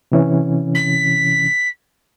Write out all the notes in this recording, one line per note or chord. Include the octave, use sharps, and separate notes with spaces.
C3 E3 C#4
B6